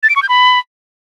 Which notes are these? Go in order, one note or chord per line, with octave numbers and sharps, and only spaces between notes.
A6
D7
C#6
G6
B5